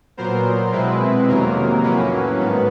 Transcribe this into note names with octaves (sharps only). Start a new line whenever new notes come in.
A#2 F#3 B3 A#4 C5
B2 G#3 C4 E4 B4
F2 C3 D#3 F#3 A#3 A#4
A2 F#3 A#3 C#4 B4
G#2 D#3 B3